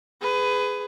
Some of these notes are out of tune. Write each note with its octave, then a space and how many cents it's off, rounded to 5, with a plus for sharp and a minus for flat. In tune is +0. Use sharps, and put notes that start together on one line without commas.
G#4 +0 B4 +20